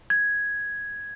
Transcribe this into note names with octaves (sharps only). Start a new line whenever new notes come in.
G#6